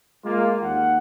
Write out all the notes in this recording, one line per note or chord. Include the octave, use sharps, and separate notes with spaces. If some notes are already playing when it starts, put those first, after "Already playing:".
G#3 A#3 F4
D#2 F#5